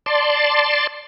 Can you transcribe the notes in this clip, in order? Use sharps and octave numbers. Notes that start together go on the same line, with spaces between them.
D5 A5 C6